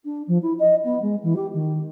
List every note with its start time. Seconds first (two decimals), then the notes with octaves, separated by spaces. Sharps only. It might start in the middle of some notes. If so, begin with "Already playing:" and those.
0.04 D4
0.27 F3
0.42 E4
0.59 D#5
0.84 B3
1.02 G#3
1.23 E3
1.36 G4
1.53 D#3